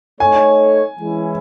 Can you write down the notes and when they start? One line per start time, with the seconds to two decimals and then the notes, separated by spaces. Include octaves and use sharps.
0.20 A3 D#4 A4 C#5 G#5
0.99 E3 G#3 C#4 E4